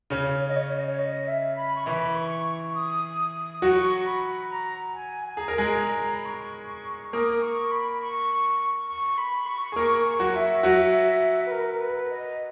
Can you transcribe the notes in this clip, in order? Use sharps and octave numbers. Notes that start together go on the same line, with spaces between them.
C#3 C#4
C#5
D#5
C#5
C#5
D#5
C#5
D#5
E5
B5
C#6
E3 E4 B5
C#6
C#6
D#6
F#3 F#4 C#6
B5
A#5
G#5
G#5
G#4 A#5
A#4
G#3 G#4
B5
C#6
A#3 A#4 D#6
C#6
B5
C#6
C#6
B5
C#6
G#4
A#3 A#4 C#6
C#6
F#3 F#4
E5
F#3 F#4
B4
A#4
A#4
B4
D#5